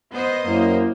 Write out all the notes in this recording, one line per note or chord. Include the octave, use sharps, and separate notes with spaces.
B3 C5 D#5
F#2 A#3 E4